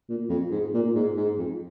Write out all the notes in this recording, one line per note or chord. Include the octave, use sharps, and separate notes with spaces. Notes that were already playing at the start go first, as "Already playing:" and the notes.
A#2
F2
G#2
A#2
G#2
G#2
F2